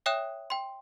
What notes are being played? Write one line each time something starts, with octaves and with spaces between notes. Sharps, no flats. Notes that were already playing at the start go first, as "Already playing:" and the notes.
C#5 E5 G5 D#6 F#6 E7
G5 C6